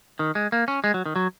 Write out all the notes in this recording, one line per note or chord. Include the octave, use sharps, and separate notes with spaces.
D#3
G#3
A#3
C#4
G#3
F#3
D#3
F#3